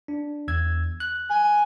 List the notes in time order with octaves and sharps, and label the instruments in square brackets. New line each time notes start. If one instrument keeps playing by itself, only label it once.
[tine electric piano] D4
E2 E6 G#6
F#6
[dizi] G#5 [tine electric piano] F#6